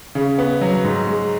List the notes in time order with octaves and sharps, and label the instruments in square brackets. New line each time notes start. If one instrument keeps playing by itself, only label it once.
[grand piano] C#3
B3
F#3
G#2
G#3